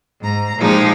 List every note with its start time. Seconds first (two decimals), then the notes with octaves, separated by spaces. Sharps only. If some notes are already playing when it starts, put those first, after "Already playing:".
0.21 G#2 A#5
0.57 A#2 F3 G#3 D#4 G4